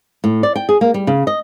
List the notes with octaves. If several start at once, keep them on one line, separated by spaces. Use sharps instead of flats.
A2
D5
G5
G#4
A#3
G3
C#3
D#5